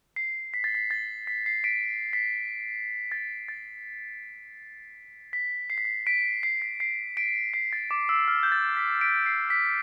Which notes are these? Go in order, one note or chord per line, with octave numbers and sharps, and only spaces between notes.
C7
B6
A6
B6
A6
B6
C7
B6 D7
B6
A6
A6
B6
C7
B6
C7
B6 D7
C7
B6
C7
B6 D7
C7
A6
D6
E6
F6
G6
A6
B6
B6 D7
C7
B6